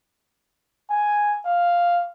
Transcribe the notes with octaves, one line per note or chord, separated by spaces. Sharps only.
G#5
F5